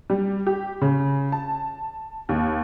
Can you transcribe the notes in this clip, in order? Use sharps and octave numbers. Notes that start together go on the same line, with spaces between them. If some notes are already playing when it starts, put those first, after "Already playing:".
G3
G4
C#3
A5
D#2